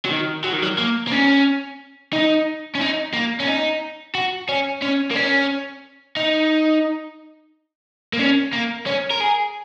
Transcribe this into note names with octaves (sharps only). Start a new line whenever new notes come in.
F#3
D#3
F#3
D#3
F#3
A#3
A#3
C#4
D#4
C#4
D#4
A#3
C#4
D#4
F#4
C#4
C#4
A#3
C#4
D#4
A#3
C#4
A#3
C#4
A#4
G#4